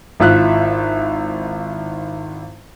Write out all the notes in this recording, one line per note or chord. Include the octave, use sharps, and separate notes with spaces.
G#1 E4 F4 E5 F#6